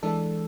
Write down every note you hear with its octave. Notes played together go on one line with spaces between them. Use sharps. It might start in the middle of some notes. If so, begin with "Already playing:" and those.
E3 G#3 D4 A4